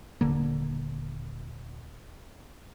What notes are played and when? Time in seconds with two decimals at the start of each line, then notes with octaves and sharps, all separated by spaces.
0.21 D#1 D3 A#3